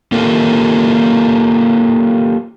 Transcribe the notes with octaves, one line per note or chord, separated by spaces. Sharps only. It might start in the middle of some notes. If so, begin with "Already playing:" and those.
A#3 F4 G4 A4 A#4